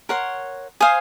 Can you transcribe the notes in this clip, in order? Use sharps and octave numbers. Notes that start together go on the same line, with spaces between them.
A#4 C#5 F#5 C6
C5 F5 G#5 D#6